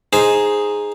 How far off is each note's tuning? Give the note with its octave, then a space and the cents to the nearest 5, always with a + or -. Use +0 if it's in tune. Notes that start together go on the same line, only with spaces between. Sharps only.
D#4 +0 G#4 +0 C5 +0